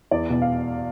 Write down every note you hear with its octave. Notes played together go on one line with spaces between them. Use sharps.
E2 D5
B2
F5